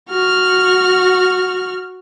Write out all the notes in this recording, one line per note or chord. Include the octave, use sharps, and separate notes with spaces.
F#4 F6